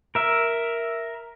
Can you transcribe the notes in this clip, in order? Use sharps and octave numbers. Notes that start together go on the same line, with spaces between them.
A#4 E5